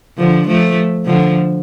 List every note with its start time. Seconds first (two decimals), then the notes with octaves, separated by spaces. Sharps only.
0.17 D3 F3
0.47 F3 A3
1.06 D3 F3